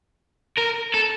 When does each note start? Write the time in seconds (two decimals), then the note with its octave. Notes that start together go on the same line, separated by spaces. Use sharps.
0.58 A#4
0.94 A4